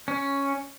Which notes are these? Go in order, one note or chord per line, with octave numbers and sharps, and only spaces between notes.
C#4